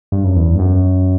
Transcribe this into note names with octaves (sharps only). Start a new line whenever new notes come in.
G2
F#2
E2
G2
F#2